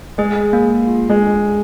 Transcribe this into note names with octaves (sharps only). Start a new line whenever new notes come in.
G#3 G#4
A#3
F4
G#3
D4